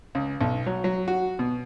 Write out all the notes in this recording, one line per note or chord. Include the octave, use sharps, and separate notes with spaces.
C#2
B1
F#3
F#3
F#4
B2